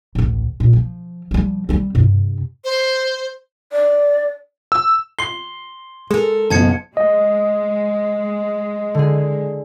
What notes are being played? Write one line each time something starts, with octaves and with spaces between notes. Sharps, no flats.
A1 D2
A#2
F3
F3 G3
G3 C4
G2 C3
C5
D5
E6
C6 C7 G7
G#3 A4 A#4
F#1 B1 B3 C#4 A5 G#6 C#7
G#3 D#5
D3 G#4